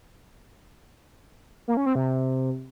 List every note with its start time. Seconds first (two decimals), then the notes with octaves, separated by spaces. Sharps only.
1.68 A#3
1.77 C#4
1.86 C4
1.95 C3